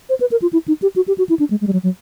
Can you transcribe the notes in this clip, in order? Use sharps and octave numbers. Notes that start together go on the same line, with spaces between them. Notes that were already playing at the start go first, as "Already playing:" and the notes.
C5
B4
A#4
F4
E4
D#4
G4
F#4
G4
F#4
E4
D4
G#3
G#3
G3
F#3
F#3